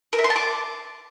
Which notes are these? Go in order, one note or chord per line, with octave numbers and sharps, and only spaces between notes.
A#4
E5
C6
A5
D6